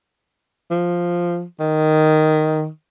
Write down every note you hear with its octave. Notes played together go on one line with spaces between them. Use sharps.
F3
D#3